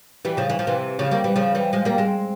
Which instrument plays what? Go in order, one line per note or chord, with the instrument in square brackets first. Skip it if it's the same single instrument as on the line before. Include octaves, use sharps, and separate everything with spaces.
[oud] E3 G3
C#3 F3
E3
F3
C3 E3
C#3 F3
G3 A#3
E3 G3
C#3 F3
E3 G3
F3 G#3
G3 A#3
G#3 C4